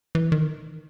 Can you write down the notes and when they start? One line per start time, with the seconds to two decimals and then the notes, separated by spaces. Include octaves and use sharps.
0.15 E3
0.32 D#3